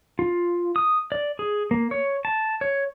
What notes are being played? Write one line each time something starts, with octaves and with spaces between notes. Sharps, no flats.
F4
D#6
D5
G#4
A#3
C#5
A5
C#5